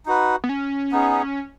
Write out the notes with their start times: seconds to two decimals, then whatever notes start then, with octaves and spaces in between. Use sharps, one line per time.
0.06 D#4 F#4 B4
0.44 B3
0.49 C#4
0.92 B3 D#4 G#4